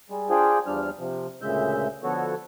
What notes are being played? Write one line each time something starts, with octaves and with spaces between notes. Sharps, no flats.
G3 G#3
D4 F4 G#4 C5 G5
E2 F3 G3 D4 F6
C3 F3
D2 A#2 C#3 G#3 E5 G6
D3 F3 B3 F#4 A4 C#5